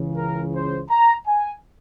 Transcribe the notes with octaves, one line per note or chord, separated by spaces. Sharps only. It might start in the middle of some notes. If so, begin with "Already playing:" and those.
Already playing: C#2 C#3 E3
A#4
C5
A#5
G#5